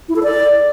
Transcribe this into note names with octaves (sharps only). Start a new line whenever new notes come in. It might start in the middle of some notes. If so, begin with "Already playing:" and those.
E4
A4
D5